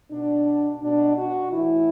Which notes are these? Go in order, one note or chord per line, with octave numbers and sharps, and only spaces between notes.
B2 D4
B2 D4
F#4
A2 E3 E4